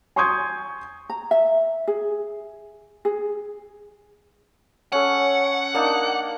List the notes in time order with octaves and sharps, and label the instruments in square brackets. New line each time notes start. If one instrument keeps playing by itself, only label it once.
[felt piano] G#5 C6 C#6 D#6 G6 G#6
[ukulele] A#5
E5
G#4
G#4
[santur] C#4 A4 [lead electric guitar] F#5
[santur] A#3 D4 D#4